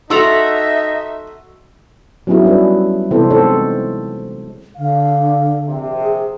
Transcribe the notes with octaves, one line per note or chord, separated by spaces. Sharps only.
D#4 F#4 A4 E5 A#5 C6 E6
F#3 B3 C#4 D#4 E4 G#4
G3 D4 G#4 B4
C3 E3 B3 C4 A4 C5
G#3 D#4 A4 C5 C#5
D3 F5
A#1 C3
G#4